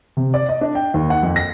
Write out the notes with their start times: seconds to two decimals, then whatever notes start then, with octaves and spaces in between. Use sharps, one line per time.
0.17 C3
0.34 D5
0.49 D#5
0.61 D4
0.75 G5
0.94 D#2
1.10 F#5
1.23 F2
1.36 A#6